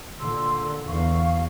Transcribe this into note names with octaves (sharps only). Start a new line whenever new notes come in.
A#2 D3 C6 E6
E2 F5 C#6